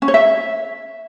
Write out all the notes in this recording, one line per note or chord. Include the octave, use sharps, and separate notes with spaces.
C#4
C#5
E5